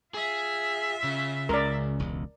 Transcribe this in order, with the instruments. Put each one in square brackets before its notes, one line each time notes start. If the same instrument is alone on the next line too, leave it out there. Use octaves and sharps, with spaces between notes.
[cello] F4 E5 [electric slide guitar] G#4
[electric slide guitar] C#3
[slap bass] C#2 [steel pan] A#4 D5
[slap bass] E1 C#2